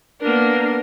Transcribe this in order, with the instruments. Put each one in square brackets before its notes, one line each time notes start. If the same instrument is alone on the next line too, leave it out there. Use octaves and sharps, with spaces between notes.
[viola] A#3 D4 [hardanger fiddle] B3 A#4